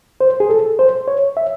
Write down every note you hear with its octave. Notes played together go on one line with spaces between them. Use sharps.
C5
G#4
A4
C5
C#5
E5